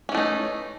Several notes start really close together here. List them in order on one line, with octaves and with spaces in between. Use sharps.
C#4 E3 A3 D#4